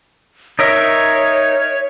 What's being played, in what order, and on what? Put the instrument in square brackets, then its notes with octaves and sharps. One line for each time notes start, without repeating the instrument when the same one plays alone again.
[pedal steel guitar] D#4 A#4 E5 [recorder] C#5